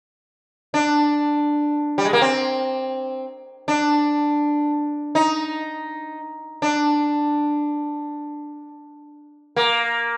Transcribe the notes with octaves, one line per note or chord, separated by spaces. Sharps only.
D4
G3
G#3
A#3
C4
D4
D#4
D4
A#3